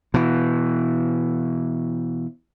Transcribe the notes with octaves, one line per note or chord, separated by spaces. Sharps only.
B2 E3